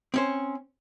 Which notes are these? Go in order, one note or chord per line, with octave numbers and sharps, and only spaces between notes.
C4 C#4 C5